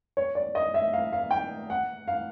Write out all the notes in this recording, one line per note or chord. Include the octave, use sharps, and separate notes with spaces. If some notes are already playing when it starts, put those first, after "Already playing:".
C#5
D5
D#5
E5
F5
F5
G5
F#5
F5